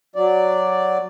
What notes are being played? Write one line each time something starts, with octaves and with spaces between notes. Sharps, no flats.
F#3 D5